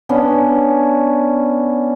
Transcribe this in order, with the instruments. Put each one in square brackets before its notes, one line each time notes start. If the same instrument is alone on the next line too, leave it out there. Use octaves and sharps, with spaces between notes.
[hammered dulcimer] B3 C#4 D4